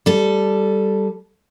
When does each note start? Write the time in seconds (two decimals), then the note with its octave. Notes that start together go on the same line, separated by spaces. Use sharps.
0.06 G3 A4